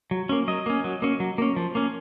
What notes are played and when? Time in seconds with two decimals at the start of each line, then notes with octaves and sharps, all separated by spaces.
0.11 F#3
0.29 A#3 C#4
0.48 F#3 D#5
0.66 A#3 C#4
0.84 F#3
1.02 A#3 C#4
1.20 F#3
1.38 A#3 C#4
1.56 F3
1.75 A#3 C#4